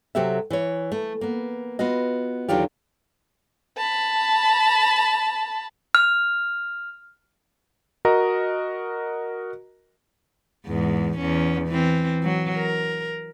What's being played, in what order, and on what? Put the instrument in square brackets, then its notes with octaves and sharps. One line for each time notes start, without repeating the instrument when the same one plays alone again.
[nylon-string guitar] C3 F#3 F#4 G4 A4 E5
E3 C#5
A3
A#3 B3
B3 F4 F#4 D#5
E2 D3 D#3 F#3 F4 G4
[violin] A5 B5
[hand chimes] F6
[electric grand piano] F#4 A#4 D#5 A#5
[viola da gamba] E2 G#2
E2 C#4
E3 C4
F#3
A#4